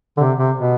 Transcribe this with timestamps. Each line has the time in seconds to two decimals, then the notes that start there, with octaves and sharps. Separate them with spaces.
0.17 D3
0.20 C3
0.38 C3
0.56 B2